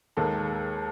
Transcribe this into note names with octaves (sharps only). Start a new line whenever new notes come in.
D#2 D#3 G#3 A4